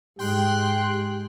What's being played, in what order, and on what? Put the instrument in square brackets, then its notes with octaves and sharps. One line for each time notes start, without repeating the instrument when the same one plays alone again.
[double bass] G#2 G#3 [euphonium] G4 [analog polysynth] G5 C6 F#6